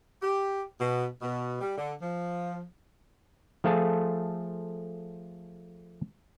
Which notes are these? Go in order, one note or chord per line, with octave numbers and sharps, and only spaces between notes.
G4
B2
B2
G3
D3
F3
F3 A3 F4 G#4 A4 A5